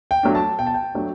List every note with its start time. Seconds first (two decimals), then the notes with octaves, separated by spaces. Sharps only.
0.11 G5
0.23 F#3 A3 D4
0.35 A5
0.58 B2 G5
0.66 A5
0.74 G5
0.94 F#3 A3 D4